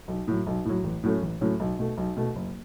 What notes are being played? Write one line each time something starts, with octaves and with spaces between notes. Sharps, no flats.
B1
A2 F#3
B1
A2 F#3
A1
A2 F#3 A3 C#4
A1
A2 F#3 A3 C#4
B1
B2 A3
B1
B2 A3
F#1